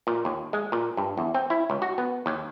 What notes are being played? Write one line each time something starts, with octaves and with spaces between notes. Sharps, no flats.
A#2
D#2
G#3
A#2
G2
E2
C4
E4
C#2
F#4
B3
D#2